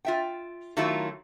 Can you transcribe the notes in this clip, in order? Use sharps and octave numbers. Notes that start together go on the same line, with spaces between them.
F4 E5 G5
D#3 F#3 A3 E4 F4